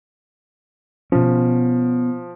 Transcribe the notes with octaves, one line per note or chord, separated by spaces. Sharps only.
B2 F3 C#4